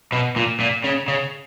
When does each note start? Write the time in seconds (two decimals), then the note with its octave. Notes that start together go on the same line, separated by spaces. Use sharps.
0.12 B2
0.36 A#2
0.60 A#2
0.84 C#3
1.08 C#3